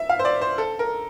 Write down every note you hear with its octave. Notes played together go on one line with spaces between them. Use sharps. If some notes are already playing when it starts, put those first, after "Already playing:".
Already playing: E5
F5
C5
D5
C5
A4
A#4